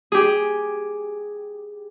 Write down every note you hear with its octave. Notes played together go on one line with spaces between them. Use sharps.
G4 G#4